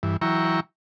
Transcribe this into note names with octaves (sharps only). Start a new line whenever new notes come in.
G2 E3
E3 F#3 E4 G5 A#5 C#6